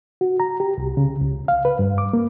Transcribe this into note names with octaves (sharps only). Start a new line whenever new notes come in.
F#4
A#5
G4
C2
C#3
C#2
F5
B4
G2
D6
A#3